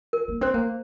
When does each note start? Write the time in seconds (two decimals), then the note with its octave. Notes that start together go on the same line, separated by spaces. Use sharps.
0.13 A#4
0.28 A#3
0.41 C4 C5
0.54 A#3